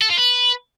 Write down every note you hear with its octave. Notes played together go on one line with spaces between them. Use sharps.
A4
F4
B4